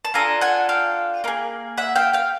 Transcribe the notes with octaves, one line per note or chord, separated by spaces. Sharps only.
A5
D4 F4 A4 G#5 A#5
F#5 G#5
F5 G5
A#3 D#4 G#4
E5 F#5
F5 G5
F5 G5